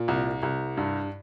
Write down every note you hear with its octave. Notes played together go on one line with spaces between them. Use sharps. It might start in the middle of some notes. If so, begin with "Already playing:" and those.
Already playing: A#2
C2
C2
G2